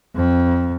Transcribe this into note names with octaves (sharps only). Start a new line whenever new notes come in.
F2